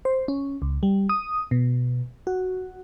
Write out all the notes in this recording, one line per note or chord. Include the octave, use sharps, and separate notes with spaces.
C5
C#4
C#2
G3
D#6
B2
F#4